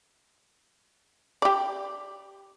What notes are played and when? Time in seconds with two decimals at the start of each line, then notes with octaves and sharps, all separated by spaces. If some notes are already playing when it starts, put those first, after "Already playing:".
1.42 G4 D5